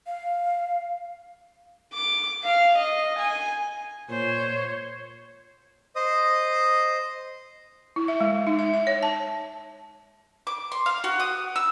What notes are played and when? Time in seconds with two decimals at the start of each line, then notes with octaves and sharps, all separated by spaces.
0.06 F5
1.93 D6
2.45 F5
2.77 D#5
3.19 G#5
4.09 A#2 C5 C#5
5.96 C5 D#5 D#6
7.96 E4
8.08 E5
8.20 G#3
8.47 D#4
8.59 E5
8.74 E5
8.87 C#5
9.03 A5
10.47 D6
10.72 C6
10.86 F5
11.04 F#4
11.20 D#6
11.56 E6